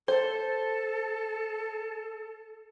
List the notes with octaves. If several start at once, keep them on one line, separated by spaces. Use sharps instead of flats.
A4 C5